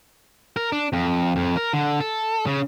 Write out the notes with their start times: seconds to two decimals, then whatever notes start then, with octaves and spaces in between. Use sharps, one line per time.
0.56 A#4
0.72 D4
0.93 F2
1.36 F2
1.57 A#4
1.73 D3
2.00 A4
2.47 C#3